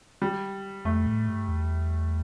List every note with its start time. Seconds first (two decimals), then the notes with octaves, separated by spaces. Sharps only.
0.22 G3
0.85 F2 A3
1.06 A2
1.28 G2
1.48 E2